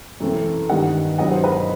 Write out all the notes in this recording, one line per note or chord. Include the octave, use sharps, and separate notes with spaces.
F#2 E3 A3 C4
G2 D#3 G3 B3 D#5 F#5
G2 F#3 B3 D#5 F#5
C5
B4 D#5